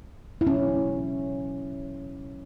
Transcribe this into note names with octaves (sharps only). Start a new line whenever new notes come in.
E4
B2 F#3 A3 C#4